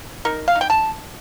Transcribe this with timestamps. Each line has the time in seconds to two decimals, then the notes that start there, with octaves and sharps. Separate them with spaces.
0.25 D#4 A#4
0.48 F5
0.55 D#4
0.61 G5
0.70 A5